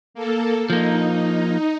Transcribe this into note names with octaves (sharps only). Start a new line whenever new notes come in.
A#3 A4
F3 A#3 D#4